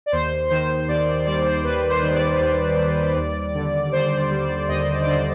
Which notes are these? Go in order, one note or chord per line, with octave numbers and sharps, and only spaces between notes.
D5
D#2 C5
D#3 C5
D#2 D5
G3 D5
C5
D#2 B4
C5
D#3
D5
D#2
G3
D#2
D3
D#2 C5
G3
D#2 D#5
D5
D3 C5